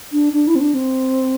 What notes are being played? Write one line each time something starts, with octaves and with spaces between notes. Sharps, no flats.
D4
D4
E4
C4
D4
C4